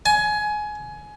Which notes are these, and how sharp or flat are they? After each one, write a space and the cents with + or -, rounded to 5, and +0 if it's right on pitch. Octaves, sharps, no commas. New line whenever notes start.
G#5 +20